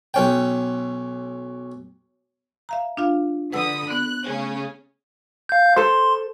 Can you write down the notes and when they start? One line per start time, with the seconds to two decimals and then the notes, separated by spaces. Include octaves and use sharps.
0.14 B1 C#4 G5
2.69 E5 F5 A#5
2.97 D4 F4 F5
3.53 D3 B4 F#5 B5 D#6 E6
3.90 B3 F#6
4.24 C#3 A3 C#4
5.49 F5 G6
5.76 A4 C5 C6